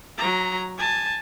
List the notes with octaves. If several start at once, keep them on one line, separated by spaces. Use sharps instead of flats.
F#3 A#5
G#5 A5